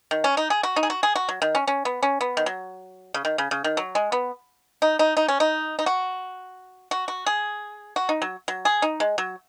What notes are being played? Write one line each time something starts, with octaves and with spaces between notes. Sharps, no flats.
D#3
C#4
D#4
G#4
F#4
D#4
G#4
F#4
G#4
F#4
F#3
D#3
C#4
C#4
B3
C#4
B3
D#3
F#3
C#3
D#3
C#3
C#3
D#3
F#3
G#3
B3
D#4
D#4
D#4
C#4
D#4
D#4
F#4
F#4
F#4
G#4
F#4
D#4
F#3
F#3
G#4
D#4
G#3
F#3